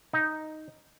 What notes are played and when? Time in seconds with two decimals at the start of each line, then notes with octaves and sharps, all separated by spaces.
0.13 D#4